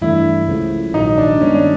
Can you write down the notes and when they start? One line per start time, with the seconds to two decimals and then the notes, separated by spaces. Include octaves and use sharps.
0.01 G2 E3 A3 D4 E4
0.48 C#2 C#3 F3 A3
0.94 A#1 G#2 D#3 F#3 D#4
1.18 D4
1.41 G2 D#3 G#3 B3 C#4
1.55 D4